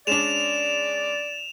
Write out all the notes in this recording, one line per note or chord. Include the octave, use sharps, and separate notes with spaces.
G#3 C#4 D4 D5 E7 F7